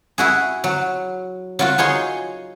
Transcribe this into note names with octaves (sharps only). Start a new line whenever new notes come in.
E4 F#4 G#4
F#3
F#3 F4 F#4
D#4 G#4 C#5 C6